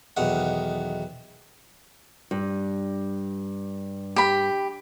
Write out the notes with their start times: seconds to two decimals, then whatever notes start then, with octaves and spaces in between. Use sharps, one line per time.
0.17 B1 E2 D#3 F#5
2.31 G2
4.16 G4 B5